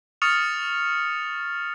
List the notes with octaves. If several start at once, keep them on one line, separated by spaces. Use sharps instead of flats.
C#6 D#6 F6 A6 C#7 F7